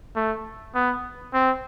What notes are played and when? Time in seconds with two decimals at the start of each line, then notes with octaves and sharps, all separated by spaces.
0.16 A3
0.75 B3
1.34 C4